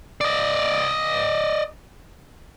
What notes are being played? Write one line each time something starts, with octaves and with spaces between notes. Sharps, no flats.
D5 D#5